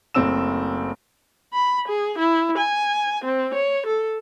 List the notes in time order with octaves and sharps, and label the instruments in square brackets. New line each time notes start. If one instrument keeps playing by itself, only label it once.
[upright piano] F#1 A3 C4 E6 E7
[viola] B5
G#4
E4
G#5
C4
C#5
A4